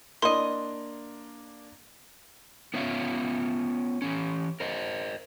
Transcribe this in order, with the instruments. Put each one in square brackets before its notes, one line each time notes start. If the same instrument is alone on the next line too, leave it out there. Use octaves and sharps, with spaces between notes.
[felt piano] A#3 D4 [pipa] E4 D#5 [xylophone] C6
[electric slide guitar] B3 C#4 F4 E5 F5
E3 C#4
A#4 C5 D#5